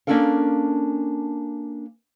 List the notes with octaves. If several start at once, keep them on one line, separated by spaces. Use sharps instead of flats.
A#3 C#4 D4 A4 A#4 F5